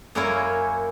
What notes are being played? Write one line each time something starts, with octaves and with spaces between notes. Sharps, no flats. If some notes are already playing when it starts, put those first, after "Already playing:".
F#2 A#3 C#4 E4 A#4 C#5